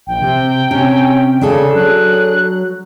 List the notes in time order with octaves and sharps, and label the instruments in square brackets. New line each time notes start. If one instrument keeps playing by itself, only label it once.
[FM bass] A#1 [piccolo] G5
[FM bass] C3
[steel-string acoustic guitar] C3 [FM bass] C#4
[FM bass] C#3 [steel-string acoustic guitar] D4 G#4 A4
[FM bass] F#3 [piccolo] F#6